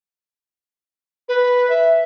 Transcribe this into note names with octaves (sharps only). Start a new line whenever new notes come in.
B4
E5